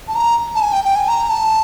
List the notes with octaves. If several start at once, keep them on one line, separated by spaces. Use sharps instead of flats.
A5
A#5
A5
G#5
G5
G5
G#5
A#5
A5